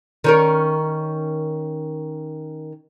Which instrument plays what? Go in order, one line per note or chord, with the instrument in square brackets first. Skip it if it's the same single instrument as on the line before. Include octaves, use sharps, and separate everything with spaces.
[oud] D#3 C#4 A#4